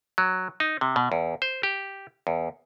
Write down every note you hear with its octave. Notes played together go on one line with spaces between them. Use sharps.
F#3
D#4
C3
B2
E2
C5
G4
E2